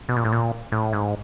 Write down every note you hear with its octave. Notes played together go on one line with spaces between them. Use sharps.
B2
A#2
A2
A#2
A2
G#2